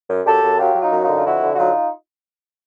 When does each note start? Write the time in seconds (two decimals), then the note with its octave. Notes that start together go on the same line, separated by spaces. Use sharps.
0.09 F#2
0.26 F#2 G4 A4
0.42 F#2
0.59 F#3 F4 G4
0.75 F#3
0.81 D#4 F4
0.92 F#2
1.04 D#4 F4
1.09 D3
1.17 F4
1.25 F2 E4 F#4
1.42 D3
1.54 F#4
1.58 F#3 D#4 F4